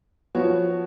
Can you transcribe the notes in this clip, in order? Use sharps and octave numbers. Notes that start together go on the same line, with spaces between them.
F3 B3 F#4 C#5